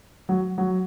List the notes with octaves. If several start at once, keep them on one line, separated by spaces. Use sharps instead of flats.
F#3
F#3